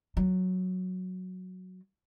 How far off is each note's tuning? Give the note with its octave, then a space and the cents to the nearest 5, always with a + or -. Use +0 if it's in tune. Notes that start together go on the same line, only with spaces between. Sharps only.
F#3 -5